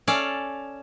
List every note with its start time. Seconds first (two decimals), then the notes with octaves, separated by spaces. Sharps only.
0.07 C#4 A4 D5 F5